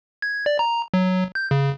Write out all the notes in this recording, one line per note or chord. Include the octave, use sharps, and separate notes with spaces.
G#6
D5
A#5
F#3
G6
C#3